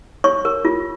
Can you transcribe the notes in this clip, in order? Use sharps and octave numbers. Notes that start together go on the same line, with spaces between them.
C#5 C#6
A#4
F4